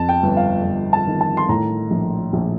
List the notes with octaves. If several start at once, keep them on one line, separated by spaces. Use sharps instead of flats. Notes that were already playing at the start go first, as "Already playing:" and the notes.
Already playing: F2 A5
G5
G1
F5
G1
A5
D#3
A5
C6
A2 A#5
A#1
A#1